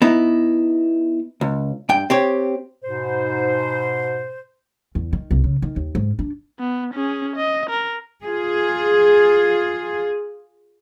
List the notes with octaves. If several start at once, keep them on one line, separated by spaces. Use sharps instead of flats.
B3 D#4 E4
C#2
G2 G5
C4 G4 C#5
G#2 B2 C5
E2
D#3
C2
C#3
D#3
D#2
G#2
D4
B3
C#4 G#4
D#5
A#4
F4 G#4